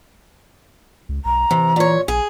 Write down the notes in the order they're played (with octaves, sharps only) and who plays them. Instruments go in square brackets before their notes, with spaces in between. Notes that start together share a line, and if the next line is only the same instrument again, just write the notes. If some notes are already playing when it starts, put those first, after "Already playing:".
[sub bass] C#2
[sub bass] B1 [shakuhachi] A#5
[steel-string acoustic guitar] C3 [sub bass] E3
[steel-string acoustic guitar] A#2 C#5
[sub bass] A#1 [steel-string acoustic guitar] G#4 [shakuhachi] G#5